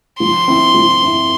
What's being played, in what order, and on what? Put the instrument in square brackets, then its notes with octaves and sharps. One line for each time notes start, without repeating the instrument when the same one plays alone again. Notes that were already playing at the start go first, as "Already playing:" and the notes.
[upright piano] F3 [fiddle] C6
[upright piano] C4 E4
F3
C4 E4